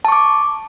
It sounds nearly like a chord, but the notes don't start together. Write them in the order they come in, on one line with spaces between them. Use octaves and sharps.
A5 C#6 D6